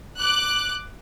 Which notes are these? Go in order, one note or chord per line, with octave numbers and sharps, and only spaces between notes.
D6 F#6